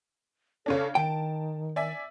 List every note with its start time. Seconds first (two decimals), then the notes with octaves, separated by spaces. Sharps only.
0.66 C#3 C#4 D4 A4
0.95 D#3 G5 A5 D7
1.76 D5 E5 G#5